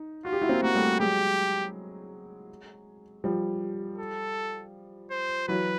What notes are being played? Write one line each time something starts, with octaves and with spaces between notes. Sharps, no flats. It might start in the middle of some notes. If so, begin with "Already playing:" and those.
Already playing: D#4
F4 F#4
G4
E4 F#4
A#3 C4
A#3 F#4
G3 A3
F#3 G#3 G4
F3 G3
A4
C5
E3 F#3 B4